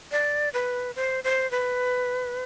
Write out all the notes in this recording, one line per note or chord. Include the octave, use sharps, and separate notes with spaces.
D5
B4
C5
C5
B4